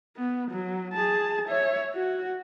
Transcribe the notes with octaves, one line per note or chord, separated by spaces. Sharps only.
B3
F#3
G#4 A5
C#5 E5
F#4